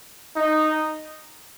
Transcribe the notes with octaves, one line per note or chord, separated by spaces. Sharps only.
D#4